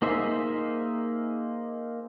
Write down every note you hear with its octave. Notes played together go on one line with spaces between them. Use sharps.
A#3 D#4 G#4 C5 E5